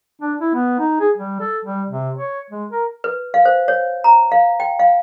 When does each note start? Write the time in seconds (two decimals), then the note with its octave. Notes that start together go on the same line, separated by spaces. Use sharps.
0.21 D4
0.41 E4
0.55 B3
0.79 D#4
1.00 G#4
1.17 G3
1.40 A4
1.65 G3
1.89 C3
2.17 C#5
2.50 G#3
2.71 A#4
3.04 B4
3.34 F5
3.45 C5
3.68 C#5
4.04 A#5
4.32 F5
4.60 G5
4.79 F5